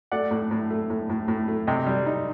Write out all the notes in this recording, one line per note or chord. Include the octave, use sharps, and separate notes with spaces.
A3 D5 F#5
A2
A2
A3
A2
A2
A2
A3
C3 D#5 G5
G3
D#4